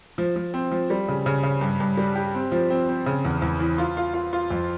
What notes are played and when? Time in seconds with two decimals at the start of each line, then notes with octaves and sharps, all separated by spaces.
0.18 F3
0.36 F3
0.54 C4
0.72 F3
0.90 G3
1.08 C#3
1.26 C#3
1.43 C#3
1.61 G2
1.80 G2
1.97 G3
2.15 G4
2.35 C4
2.52 F3
2.70 C4
2.89 C4
3.06 C#3
3.25 E2
3.42 E2
3.60 E3
3.78 F4
3.97 F4
4.14 F4
4.33 F4
4.51 F2